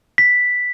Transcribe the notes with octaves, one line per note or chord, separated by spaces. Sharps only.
B6